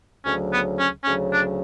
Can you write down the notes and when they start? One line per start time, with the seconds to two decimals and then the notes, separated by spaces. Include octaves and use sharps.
0.25 D2 C#3 F#3 C#4
0.51 B3
0.78 C#4
1.04 D2 C#3 F#3 C#4
1.31 D4